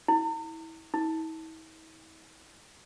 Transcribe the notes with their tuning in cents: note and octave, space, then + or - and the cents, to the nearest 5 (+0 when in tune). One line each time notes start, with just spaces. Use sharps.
E4 -30
E4 -45